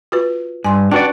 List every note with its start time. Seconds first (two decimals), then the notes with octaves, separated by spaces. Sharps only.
0.12 F4 F#4 B4
0.64 G2 G#5 C6
0.92 C#4 D4 F#4 B4 D5 G5